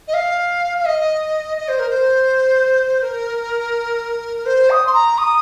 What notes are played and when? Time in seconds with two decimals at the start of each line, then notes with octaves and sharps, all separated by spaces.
0.07 D#5
0.13 F5
0.78 F5
0.85 D#5
1.57 D#5
1.68 C5
1.79 A#4
1.89 C5
3.02 A#4
4.45 C5
4.70 D#6
4.86 C6
4.93 A#5
5.18 D#6